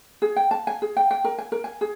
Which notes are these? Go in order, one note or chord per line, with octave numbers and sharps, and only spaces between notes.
G#4
G5
A5
G#5
G#4
G5
G5
A#4
G#5
A#4
G#5
G#4